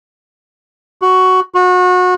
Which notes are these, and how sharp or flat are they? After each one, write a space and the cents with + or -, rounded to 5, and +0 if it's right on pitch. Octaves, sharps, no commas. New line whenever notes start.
F#4 +5
F#4 -30